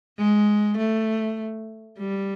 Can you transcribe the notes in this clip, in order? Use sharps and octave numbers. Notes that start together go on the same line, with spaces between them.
G#3
A3
G3